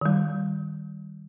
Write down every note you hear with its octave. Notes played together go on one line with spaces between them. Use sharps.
D#3 G3